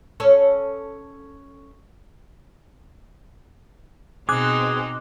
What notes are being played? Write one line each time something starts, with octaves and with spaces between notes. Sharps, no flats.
C#4 A4 C#5
B2 C4 D#4 G#4 D6 F#6